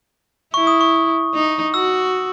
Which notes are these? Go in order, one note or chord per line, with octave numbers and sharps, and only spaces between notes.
E4 C#6
D#6
C#6
D#4
F#4 E6